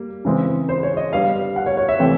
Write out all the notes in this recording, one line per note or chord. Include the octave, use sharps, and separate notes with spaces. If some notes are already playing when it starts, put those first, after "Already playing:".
Already playing: G3 A#3
C#3 E3 G#3 C4
C5
C#5
D#5
D3 G3 B3 F5
F#5
C#5
C#5
E5
C3 E3 A3 C4 G5